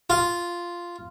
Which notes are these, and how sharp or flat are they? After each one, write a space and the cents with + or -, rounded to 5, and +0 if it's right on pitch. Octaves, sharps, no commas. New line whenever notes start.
F4 -5